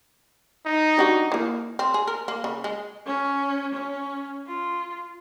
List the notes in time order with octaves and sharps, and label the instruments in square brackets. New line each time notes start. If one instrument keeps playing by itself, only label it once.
[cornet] D#4
[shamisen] G3 D4 F#4
E3 A#3
C4
G#4
A#4
A#3
C#3
G#3
[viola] C#4
C#4
F4